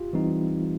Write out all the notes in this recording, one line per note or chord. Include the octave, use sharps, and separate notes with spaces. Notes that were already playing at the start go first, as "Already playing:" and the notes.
Already playing: F4 G4
E3 G3 C4 D#4